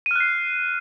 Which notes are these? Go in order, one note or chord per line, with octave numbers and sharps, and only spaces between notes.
F6 F#6 C7 D#7